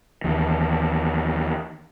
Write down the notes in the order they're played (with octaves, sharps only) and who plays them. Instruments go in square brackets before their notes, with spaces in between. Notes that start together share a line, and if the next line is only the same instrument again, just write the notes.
[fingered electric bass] D#2 E3